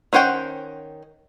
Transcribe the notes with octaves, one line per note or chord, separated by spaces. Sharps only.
D#3 C#4 C5 F#5 G5